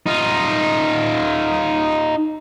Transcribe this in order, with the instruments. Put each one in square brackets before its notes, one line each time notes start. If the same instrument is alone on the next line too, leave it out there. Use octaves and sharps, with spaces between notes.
[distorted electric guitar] D#4 F4